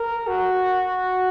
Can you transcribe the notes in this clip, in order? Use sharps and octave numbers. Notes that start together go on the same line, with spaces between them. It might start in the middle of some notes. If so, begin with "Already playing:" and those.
Already playing: A#4
F#4